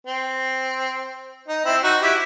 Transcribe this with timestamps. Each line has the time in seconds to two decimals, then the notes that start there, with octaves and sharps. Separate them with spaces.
0.07 C4
1.48 D#4
1.65 C4 E4
1.83 D#4 F#4
2.01 E4 G4